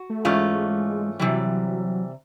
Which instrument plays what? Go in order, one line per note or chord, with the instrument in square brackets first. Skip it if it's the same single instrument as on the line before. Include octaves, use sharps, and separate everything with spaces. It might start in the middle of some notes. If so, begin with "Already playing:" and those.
Already playing: [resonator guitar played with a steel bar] F#4
[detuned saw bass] A3
[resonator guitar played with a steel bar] G#2 E3 A3 C#4 F4 [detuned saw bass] G#3
[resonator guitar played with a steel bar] C3 E3 G3 [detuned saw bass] F#3